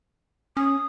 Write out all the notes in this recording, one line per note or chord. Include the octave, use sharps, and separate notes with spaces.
C#4 D#6